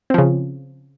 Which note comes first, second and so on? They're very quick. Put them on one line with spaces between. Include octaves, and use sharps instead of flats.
C4 F3 C#3